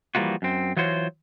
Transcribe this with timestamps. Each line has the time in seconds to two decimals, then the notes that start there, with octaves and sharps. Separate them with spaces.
0.15 E3 F3 G3 A#3 F4 F#4
0.42 F#2 C4
0.77 E3 F#3 F4 F#4 C5 C#5